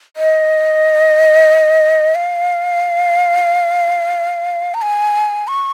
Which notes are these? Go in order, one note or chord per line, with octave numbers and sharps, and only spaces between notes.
D#5
F5
A#5
G#5
C#6